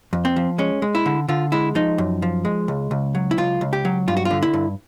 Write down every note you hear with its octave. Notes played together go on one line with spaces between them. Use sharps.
F2
C4
F3
G#3 C#4
G#3
E4
D3
D3 F4
G#3 E4
F3 D#4
F#2
F3
G#3
C#2
C#2
F#3
E4
C#2 F4
C#2
G4
F#3
G2 F4
F#4
F4
D3
E4
G2